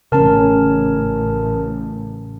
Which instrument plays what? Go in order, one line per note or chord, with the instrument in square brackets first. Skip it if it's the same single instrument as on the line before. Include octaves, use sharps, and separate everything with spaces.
[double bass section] A1 [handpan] C#3 C#4 [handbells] A#4 A5